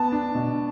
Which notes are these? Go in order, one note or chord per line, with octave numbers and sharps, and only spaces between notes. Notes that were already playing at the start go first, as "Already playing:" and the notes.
Already playing: B3 A5
D4
B2